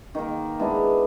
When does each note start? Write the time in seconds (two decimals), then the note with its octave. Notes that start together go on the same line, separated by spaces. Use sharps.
0.15 D#3 A#3
0.59 G#3 B3 D4 E4